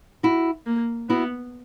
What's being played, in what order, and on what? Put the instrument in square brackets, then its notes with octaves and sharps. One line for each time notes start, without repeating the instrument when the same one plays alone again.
[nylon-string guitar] E4 F#4
[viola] A#3
[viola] B3 [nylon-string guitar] E4 F#4